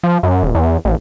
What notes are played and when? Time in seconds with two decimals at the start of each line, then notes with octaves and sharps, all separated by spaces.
0.03 F3
0.23 F#2
0.43 D#1
0.55 E2
0.85 A1